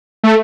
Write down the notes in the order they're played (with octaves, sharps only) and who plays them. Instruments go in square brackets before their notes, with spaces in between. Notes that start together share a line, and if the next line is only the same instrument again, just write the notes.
[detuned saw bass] A3